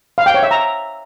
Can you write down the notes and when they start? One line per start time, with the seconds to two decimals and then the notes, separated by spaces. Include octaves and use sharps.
0.18 F5
0.26 G5
0.34 C#5
0.43 E5
0.51 A#5